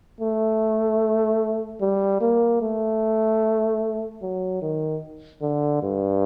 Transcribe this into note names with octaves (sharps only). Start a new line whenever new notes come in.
A3
G3
A#3
A3
F#3
D#3
D3
G2